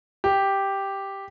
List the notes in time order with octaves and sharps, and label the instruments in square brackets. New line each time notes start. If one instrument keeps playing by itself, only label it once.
[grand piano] G4